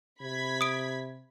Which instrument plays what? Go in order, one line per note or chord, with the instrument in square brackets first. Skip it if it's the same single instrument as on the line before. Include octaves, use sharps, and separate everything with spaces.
[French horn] C3 [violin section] B5 G#6 B6
[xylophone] D#6 D7